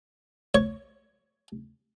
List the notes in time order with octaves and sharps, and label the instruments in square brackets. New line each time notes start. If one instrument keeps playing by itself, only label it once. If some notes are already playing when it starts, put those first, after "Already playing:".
[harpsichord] C#5